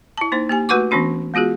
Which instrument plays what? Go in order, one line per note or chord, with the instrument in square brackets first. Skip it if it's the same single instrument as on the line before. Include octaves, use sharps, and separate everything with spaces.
[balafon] E4 A5
A#3 D#4 C5
A#3 G4 G#5
A3 F#4 B4 F#5 C#6 D6
E3 B3 C#4 D4 F#4
G#3 B3 F4 F#4 G#4